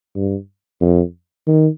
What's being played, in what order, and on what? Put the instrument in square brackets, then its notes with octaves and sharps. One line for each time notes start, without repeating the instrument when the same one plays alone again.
[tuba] G2
F2
D#3